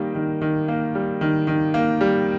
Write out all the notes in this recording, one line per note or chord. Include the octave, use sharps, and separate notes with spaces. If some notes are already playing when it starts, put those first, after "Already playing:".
Already playing: D#3 G3 A#3
D#3
D#3
A#3
G3
D#3
D#3
A#3
G3